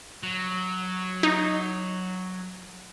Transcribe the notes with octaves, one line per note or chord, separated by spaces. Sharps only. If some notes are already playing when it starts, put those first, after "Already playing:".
F#3
D#4